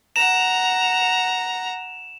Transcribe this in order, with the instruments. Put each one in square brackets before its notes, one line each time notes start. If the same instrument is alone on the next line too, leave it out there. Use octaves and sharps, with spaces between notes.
[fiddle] F#5 A#5 [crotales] E7 F7